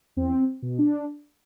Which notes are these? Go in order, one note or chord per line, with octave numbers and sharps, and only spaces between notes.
E2 C4
B2
D4